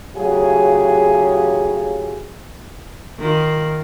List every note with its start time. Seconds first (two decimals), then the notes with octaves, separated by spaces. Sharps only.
0.16 A2 C#3 F#3 F4 G4 G#4
3.20 D#3 F4